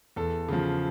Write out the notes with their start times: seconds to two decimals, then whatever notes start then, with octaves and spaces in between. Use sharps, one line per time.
0.16 E2 A4
0.48 C#3 F3